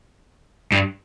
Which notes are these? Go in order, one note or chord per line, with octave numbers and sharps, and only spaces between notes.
G2